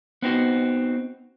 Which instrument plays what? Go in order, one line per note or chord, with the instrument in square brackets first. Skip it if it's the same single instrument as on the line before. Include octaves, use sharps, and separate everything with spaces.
[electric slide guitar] B3 C4 D#4 F#4